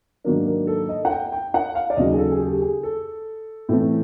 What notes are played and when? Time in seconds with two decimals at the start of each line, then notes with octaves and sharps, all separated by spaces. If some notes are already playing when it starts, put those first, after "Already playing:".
0.24 G#2 D#3 F#3 A#3 D4 A#4
0.46 A#4
0.67 A4
0.89 D#5
1.05 F#5
1.11 G5
1.32 G5
1.54 F#5
1.75 F5
1.90 D5
1.96 D#2 C#3 F#3 D#5
2.13 G#4
2.18 A4
2.31 G#4
2.39 G4
2.62 G#4
2.83 A4
3.69 A2 E3 A3 C4